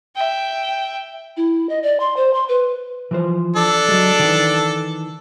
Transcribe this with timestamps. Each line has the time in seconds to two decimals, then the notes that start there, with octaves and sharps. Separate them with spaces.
0.15 E5 G5
1.37 E4
1.69 D#5
1.83 D5
2.00 C6
2.17 C5
2.34 C6
2.49 B4
3.11 E3 F3 C5
3.56 D4 A4
3.88 F#3 G#3
4.19 D#3 E3